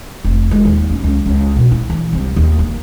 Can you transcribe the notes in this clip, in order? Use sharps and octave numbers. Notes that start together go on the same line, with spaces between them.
F1
G#3
D#2
F#2
C#2
C#2
B2
E4
E3
C2
D#2
A#3